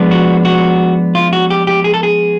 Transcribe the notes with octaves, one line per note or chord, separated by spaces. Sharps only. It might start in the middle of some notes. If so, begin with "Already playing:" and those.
Already playing: F3 G#3 B3 D4
F#4
F#4
F4
F#4
G4
G4
G#4
A4
G#4